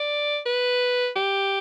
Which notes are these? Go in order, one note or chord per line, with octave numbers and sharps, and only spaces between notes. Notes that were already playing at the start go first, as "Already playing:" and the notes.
Already playing: D5
B4
G4